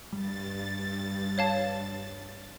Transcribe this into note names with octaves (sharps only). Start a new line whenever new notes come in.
G2 G3 A6
C#5 F5 A5